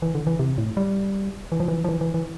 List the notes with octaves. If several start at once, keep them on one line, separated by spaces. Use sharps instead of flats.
E3
D3
E3
C3
A2
G3
E3
F3
E3
F3
E3
E3
E3